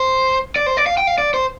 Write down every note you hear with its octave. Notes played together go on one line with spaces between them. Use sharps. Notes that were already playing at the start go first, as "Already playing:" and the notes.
Already playing: C5
D5
C5
D5
F5
G5
F5
D5
C5